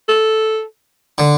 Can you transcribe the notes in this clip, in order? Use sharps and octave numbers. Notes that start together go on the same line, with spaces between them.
A4
D3